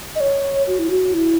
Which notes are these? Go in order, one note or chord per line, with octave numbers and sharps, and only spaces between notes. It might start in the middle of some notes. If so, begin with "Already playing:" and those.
D#5
C#5
F#4
E4
F#4
E4